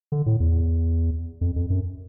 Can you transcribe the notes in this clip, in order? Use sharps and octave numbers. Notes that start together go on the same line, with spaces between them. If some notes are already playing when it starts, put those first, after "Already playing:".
D3
A2
E2
F2
F2
F#2